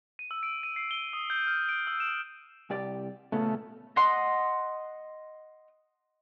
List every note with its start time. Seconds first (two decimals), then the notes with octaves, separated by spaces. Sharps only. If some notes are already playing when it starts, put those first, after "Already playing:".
0.19 D#7
0.31 E6
0.43 D7
0.63 D#7
0.76 C7
0.91 G7
1.13 D#6
1.30 G6
1.47 F6
1.69 D7
1.87 E6
2.00 E7
2.70 C2 G4 D5
3.32 A#2 C#3 A3 B3
3.96 D#5 F#5 C6